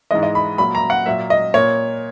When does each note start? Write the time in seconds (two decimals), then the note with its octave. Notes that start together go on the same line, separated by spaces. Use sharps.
0.11 G#2 E3 G#3 D#5
0.23 D#5
0.35 B5
0.58 A#2 F#3 A#3 B5
0.75 A#5
0.90 F#5
1.06 A#2 F#3 A#3 E5
1.30 D#5
1.54 A#2 A#3 C#5